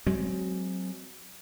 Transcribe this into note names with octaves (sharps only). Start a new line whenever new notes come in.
F#3 G#3 C4